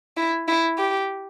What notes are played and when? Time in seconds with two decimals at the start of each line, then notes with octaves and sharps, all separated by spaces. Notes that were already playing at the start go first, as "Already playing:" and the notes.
0.17 E4
0.48 E4
0.78 G4